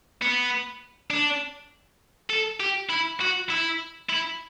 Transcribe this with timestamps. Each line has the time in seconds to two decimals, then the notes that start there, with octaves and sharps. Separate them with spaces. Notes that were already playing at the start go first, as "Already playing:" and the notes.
0.22 B3
1.10 D4
2.30 A4
2.60 G4
2.89 E4
3.20 F#4
3.49 E4
4.09 E4